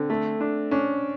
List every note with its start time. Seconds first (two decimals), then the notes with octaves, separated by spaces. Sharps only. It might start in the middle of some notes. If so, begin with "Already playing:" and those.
Already playing: D3 C4
0.10 A3
0.41 D4
0.71 C#4 D4